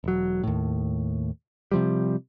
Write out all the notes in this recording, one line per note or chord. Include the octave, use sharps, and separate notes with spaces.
E1 F#3
D#2 A2
C3 F3 G3